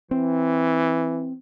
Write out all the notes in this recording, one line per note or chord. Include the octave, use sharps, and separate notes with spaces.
E3 C4